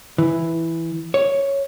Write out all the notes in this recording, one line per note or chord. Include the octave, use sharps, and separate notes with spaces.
E3
C#5